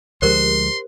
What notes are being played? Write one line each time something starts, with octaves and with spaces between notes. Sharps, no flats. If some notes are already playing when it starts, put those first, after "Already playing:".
D2 F3 G#3 G4 A#4 C5 C6